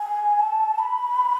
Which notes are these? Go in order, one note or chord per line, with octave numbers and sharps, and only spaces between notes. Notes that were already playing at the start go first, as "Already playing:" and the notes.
Already playing: G#5
A5
B5